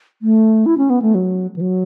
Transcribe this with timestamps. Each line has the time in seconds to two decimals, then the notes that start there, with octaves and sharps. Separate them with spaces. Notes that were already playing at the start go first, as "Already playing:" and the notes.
0.22 A3
0.66 E4
0.78 C#4
0.90 B3
1.02 A3
1.15 F#3
1.56 E3
1.61 F#3